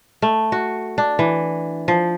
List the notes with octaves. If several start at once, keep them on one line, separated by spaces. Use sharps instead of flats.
A3
F#4
D4
E3
F3